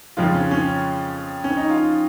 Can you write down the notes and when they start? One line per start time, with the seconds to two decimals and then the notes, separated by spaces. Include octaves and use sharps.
0.17 F2 C#3 F3 G#3 F4
0.34 C#4
0.51 C#4
1.44 C#4
1.57 D#4
1.70 F4